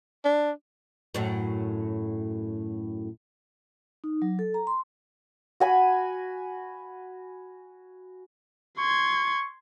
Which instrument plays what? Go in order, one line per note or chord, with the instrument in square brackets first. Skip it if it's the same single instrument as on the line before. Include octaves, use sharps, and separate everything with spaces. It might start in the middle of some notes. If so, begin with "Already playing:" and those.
[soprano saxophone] D4
[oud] F#2 A2 F#3
[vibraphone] D#4
F#3
A4
A#5
C6
[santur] F#4 G#5 B5
[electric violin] C6 G#6 [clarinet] C#6